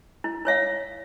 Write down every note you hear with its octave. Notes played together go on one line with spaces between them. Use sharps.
E4
E4 C#5 E5 F5